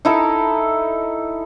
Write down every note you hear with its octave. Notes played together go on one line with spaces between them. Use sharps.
D#4 E4 A4 A#5